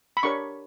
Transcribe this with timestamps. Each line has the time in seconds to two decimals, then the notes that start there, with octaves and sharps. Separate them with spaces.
0.17 B5
0.23 D4 G4 A#4 C#5 C#6